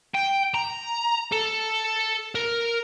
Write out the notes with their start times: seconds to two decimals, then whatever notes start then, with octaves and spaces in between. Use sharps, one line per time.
0.15 G5
0.54 A#5
1.32 A4
2.35 A#4